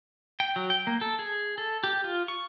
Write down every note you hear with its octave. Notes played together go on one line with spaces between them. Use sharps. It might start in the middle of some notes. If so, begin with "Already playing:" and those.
G5
F#3
G5
A#3
A4
G#4
A4
G4
F4
C#6